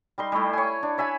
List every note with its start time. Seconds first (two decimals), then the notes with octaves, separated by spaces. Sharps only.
0.18 G3 D#4 C6
0.32 G3 A3 E4
0.53 C#5 G#5
0.83 D4
0.98 C#5 E5 G#5 B5